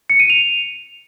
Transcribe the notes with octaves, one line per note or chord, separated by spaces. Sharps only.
C#7
D#7
F7